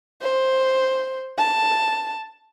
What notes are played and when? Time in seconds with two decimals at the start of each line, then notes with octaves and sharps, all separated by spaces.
0.22 C5
1.38 A5